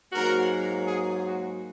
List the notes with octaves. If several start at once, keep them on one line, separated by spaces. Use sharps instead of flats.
G#2 F#3 A#3 F#4 A#4
G#4
F#4